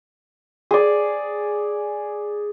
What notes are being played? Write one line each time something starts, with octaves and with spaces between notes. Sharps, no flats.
G#4 D5